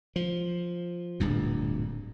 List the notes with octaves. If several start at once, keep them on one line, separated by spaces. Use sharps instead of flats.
F3
D1 G2 A#2